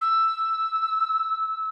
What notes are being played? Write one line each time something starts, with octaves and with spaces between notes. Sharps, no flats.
E6